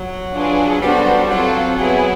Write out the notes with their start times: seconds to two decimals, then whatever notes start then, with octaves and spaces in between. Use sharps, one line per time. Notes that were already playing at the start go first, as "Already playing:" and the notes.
Already playing: F#3
0.33 D4 F4 G#4 B4
0.81 G3 B3 D4 F#4 A4 C5
1.29 F#3 C4 F4 A4
1.77 F#3 B3 E4 G#4